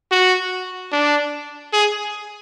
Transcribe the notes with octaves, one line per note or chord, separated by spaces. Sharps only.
F#4
D4
G#4